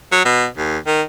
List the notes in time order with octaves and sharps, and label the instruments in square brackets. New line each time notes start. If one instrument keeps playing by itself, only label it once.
[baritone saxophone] F#3
B2
D#2
D#3